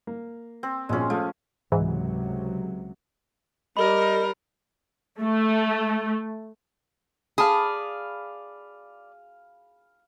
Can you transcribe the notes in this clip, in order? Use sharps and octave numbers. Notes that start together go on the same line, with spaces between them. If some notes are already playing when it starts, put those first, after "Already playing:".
A#3
C4
A#1 B2 F3 G#3 C#4
F3 A3
C#2 G#2 C3 E3 F#3
G3 A#4 D#5 B5
A3
G#4 D5 F5 A5 B5 D#6